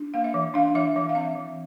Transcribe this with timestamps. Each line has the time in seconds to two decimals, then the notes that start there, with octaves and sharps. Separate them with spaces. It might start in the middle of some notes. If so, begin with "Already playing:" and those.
Already playing: D4
0.14 A#3 F5
0.24 E5
0.34 E3
0.54 D4 F5
0.75 E3 E5
0.95 E3 E5
1.09 F5
1.15 C4 E5
1.36 E3